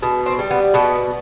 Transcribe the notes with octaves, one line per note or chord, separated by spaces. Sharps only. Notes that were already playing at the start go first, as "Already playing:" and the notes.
B2
C4
G3
B3
B2 B3